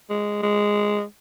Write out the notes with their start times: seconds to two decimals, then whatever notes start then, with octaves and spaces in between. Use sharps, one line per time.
0.10 G#3
0.42 G#3